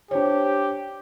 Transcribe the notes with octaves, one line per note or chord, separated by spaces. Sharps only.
D4 G4 C5 C#5